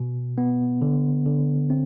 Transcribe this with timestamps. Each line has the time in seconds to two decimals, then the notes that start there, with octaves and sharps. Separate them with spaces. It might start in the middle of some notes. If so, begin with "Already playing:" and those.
Already playing: B2
0.38 B3
0.82 D3
1.26 D3
1.70 C4